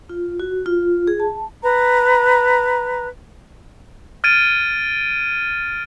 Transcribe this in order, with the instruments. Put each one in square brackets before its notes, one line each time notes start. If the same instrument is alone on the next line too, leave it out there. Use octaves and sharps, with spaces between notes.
[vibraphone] F4
F#4
F4
G#4
A5
[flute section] B4 A#5
[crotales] F6 G#6 A6 D7 D#7